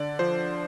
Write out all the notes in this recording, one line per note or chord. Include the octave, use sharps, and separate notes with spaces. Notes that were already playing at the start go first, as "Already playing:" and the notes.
Already playing: D3 D5
F3 C5